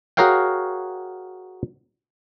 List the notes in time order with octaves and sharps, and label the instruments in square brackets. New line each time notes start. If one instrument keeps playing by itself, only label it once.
[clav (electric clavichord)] F#4 G#4 A#4 C#5 F5 G5